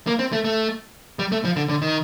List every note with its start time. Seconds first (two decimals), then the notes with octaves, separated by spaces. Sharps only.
0.07 A#3
0.19 C4
0.32 A3
0.44 A3
1.19 G3
1.32 A3
1.45 F3
1.56 D3
1.69 D3
1.82 D#3